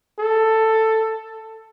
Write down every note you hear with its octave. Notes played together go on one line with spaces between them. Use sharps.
A4